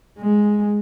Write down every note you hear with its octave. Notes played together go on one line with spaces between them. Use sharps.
G#3